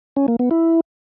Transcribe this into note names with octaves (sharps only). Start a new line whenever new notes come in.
C#4
A#3
B3
E4